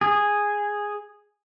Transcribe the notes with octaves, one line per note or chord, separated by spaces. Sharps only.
G#4